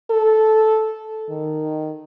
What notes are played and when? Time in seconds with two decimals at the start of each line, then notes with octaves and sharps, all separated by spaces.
0.11 A4
1.29 D#3